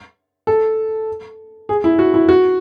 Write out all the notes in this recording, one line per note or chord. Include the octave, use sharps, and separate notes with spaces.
A4
G#4
E4
F#4
E4
F#4